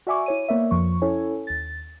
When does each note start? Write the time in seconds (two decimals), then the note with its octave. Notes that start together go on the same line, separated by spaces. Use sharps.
0.07 F#4 D5 E5 G#5 C#6 D6
0.26 E4 C#5 D#7
0.48 A#3 B3 A#4 C#5 D5 E5
0.71 F2 F3 C#6
1.02 C#4 E4 A4 C#5 G#5
1.47 D#2 A6